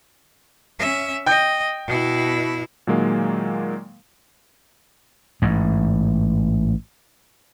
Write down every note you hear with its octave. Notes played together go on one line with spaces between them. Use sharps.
C#4 E5
D#5 G5 G6
B2 E4
A#2 D#3 F#3 G#3 A#3
A1 G#2